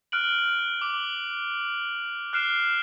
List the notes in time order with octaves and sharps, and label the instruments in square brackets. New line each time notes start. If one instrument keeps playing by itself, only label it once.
[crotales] F6 F#6 D7 F#7
D6 F#7
F6 F#6 C7 D7 E7